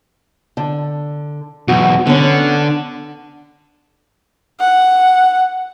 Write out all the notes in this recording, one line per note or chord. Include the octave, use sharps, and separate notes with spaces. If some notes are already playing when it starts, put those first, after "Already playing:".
D3
B1 E2 F#4
D3 B3 C#4
F#5